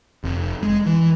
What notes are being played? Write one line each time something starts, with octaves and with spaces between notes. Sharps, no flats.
F1
G#3
E3